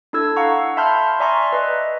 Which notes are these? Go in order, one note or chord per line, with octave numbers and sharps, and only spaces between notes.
D4 E4 A4 E6 G#6
F5 F#5 A#5 C#6
E5 A5 B5 C6 F6 G6
D5 E5 G#5 A#5 C6 C#6
B4 D#5 E5